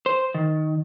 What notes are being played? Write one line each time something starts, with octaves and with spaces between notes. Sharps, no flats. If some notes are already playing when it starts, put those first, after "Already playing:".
C5
D#3